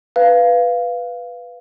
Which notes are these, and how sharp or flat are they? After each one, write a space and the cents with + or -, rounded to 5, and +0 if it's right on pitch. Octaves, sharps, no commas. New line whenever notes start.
B4 +0 F5 -10